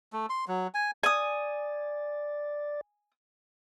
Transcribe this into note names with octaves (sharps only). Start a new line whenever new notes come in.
A3
C6
F#3
G#5
D5 G#5 D#6